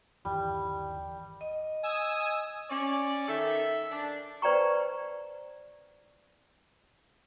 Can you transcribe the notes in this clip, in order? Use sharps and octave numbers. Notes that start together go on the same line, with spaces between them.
G1 D#2 E3 G3
D#5
G#5 D#6 E6
C#4 D5
D#3 A4 E5
D4
B4 C5 D5 G5 A#5 C#6